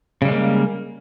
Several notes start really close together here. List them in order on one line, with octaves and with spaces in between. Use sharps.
C#3 G3 G#3 A#3